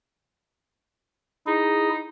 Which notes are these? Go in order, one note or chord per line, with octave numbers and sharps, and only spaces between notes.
D#4 E4 G#4